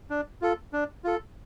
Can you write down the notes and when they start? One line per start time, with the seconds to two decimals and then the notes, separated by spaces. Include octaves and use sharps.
0.10 D4
0.42 F4 A4
0.73 D4
1.04 F4 A4